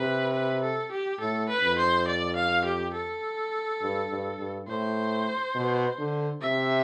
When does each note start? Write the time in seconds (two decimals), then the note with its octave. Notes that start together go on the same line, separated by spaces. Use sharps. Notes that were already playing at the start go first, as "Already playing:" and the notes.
Already playing: C3 B4
0.33 B4
0.62 A4
0.91 G4
1.20 A2 A4
1.49 B4
1.63 F2
1.78 C5
2.07 D5
2.36 F5
2.65 G4
2.93 A4
3.81 G2
4.10 G2
4.39 G2
4.68 A2 C5
5.55 B2
5.99 D3
6.41 C3 E5